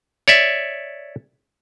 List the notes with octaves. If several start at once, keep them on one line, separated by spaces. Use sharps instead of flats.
C#5 D5 E5